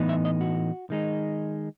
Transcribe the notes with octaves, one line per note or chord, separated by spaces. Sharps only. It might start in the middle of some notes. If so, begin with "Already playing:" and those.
Already playing: A2 E3 B3 D#4
E5
D#5
F#4
D#3 G#3 D#4